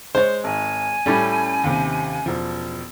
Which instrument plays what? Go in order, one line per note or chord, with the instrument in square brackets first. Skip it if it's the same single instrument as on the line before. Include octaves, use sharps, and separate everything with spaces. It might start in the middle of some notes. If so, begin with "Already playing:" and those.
[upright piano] G#3 C#5 [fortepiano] C5
[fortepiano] G#1 [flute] G#5
[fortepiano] A2 G3 C#4 [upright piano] A4
[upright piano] D#2 C3
E1 F3